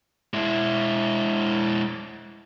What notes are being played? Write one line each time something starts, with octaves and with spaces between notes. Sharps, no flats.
G#3 E4